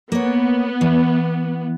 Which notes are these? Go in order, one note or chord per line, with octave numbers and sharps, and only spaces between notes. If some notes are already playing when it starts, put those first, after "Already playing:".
A#3 B3 C#5
E3